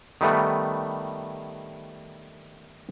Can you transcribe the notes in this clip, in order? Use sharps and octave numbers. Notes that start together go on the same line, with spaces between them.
D#3 G3 A3 B3